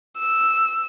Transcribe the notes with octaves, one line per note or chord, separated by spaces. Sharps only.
E6